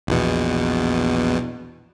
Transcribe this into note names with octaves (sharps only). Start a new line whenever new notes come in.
A#1 E2 B2